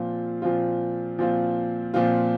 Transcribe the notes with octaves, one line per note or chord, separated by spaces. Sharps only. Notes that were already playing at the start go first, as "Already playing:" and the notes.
Already playing: A#2 F3 C4 F4
A#2 F3 C4 F4
A#2 F3 C4 F4
A#2 F3 C4 F4